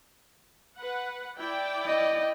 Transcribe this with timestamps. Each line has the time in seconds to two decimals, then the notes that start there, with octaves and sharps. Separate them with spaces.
0.77 B4 F#5
1.37 E4 D5 G5
1.86 D#5